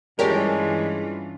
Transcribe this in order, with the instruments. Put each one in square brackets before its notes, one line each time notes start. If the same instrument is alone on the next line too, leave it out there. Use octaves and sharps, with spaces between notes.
[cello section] G2 E3 F4 [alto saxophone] G#3 [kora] C#4 D4 [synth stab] G4 A#4